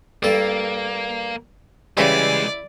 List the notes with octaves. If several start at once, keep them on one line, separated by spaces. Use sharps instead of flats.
G2 A#3 A4
C#2 C#3 E3 G3 G#3 E4 D5